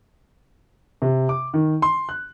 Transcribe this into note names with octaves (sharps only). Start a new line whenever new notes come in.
C3
D6
D#3
C6
F#6